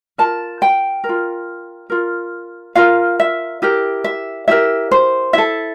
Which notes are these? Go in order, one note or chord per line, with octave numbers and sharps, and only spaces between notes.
F4 A#4 A5
G5
A#4
F4
F4 A#4
F4 A#4 F5
E5
E4 G4 A#4
E5
E4 G4 A#4 E5
C5
E4 A4 E5